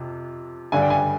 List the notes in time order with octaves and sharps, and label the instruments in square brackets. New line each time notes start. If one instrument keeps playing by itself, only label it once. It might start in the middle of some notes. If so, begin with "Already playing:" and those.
Already playing: [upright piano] F2 C3
G2 D3 G3 D4 G#5
G5
G#5